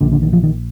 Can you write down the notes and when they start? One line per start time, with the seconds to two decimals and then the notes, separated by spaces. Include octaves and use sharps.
0.01 A#1 A#2 D3
0.12 D3
0.22 D#3
0.33 F3
0.43 D#3